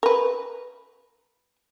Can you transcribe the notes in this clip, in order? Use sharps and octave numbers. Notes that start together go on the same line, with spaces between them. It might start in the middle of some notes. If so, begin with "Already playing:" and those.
A#4 B4